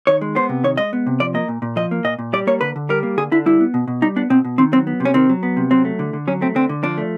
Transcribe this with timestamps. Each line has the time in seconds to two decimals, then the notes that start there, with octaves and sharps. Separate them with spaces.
0.07 D#3 C#5
0.21 G#3
0.35 B3 C5
0.49 C3
0.64 D#3 C#5
0.77 G#3 D#5
0.93 B3
1.07 C3
1.20 F3 D5
1.34 A#3 D#5
1.48 A#2
1.62 A#2
1.76 F3 D#5
1.91 A#3
2.04 A#2 D#5
2.19 A#2
2.33 G3 D5
2.47 A#3 C#5
2.61 D3 B4
2.76 D3
2.89 G3 A#4
3.03 A#3
3.17 D3 G#4
3.32 D3 E4
3.46 G3 E4
3.60 B3
3.74 B2
3.88 B2
4.02 G3 D#4
4.16 B3 D4
4.30 B2 C4
4.45 B2
4.58 D#3 C4
4.72 F#3 C4
4.87 B3
5.00 C3
5.05 C#4
5.14 D#3 C4
5.29 F#3
5.43 B3
5.57 C3
5.71 F#3 C4
5.85 A3
5.99 D3
6.13 D3
6.27 F#3 C#4
6.41 A3 C4
6.55 D3 C4
6.69 D3
6.83 F3 D4
6.98 A3